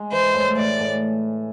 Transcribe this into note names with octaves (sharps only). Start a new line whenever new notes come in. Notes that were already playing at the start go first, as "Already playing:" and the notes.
Already playing: G#3
E3 C5
A2
A2 D5
A2